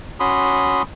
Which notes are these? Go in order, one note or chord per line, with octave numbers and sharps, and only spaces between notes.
C#4 F#4 B5 C6 D#6